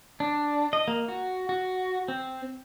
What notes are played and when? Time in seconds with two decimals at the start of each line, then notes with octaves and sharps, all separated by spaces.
0.20 D4
0.73 D#5
0.88 A#3
1.08 F#4
1.49 F#4
2.08 C4